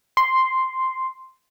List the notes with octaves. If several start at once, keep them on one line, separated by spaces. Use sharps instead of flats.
C6